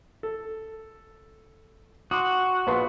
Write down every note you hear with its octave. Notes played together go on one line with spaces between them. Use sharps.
A4
F#4 C6 D6 D#6
A#1 B3 C6